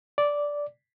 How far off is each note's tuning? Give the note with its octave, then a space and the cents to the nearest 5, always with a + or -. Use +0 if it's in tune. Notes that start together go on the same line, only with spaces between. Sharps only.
D5 -10